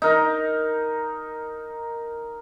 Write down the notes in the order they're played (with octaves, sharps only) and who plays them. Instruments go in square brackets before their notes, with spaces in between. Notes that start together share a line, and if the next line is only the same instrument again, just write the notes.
[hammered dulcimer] D#4 A#4